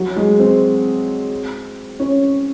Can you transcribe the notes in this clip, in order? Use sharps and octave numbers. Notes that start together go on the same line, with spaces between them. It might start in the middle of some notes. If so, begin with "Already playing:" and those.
Already playing: F#3
G#3
C4
C#4